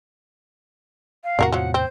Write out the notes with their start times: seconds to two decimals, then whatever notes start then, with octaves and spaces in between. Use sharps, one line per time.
1.24 F5
1.39 E2 A2 C3 F#4 A#4 D5
1.52 F3 F#3 F#5
1.74 C4 C5